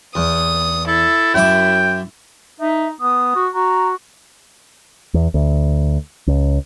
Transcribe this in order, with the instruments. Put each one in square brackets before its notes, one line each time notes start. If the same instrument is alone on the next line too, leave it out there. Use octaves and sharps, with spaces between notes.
[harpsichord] E2 [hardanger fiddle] D#6
[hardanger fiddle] E4 [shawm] A4
[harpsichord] F#2 E5 D6 [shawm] G5
[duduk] D#4 [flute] E5
[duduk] B3 [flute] D#6
[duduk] F#4
[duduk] F#4 [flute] A#5
[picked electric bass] E2
D2
C#2